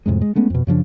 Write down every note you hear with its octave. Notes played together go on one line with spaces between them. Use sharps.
F2 A2 C3 G#3
G#3
G#3 A3 B3 C#4
F2 B2
F#2 C#3 F3 D4